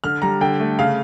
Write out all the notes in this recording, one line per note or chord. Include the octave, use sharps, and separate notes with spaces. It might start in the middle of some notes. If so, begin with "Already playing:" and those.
D3 F6
G3 A#5
D3 G5
A3
C#3 F5